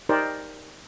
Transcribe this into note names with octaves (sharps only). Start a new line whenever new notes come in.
D#4 G4 A#4 C5 D5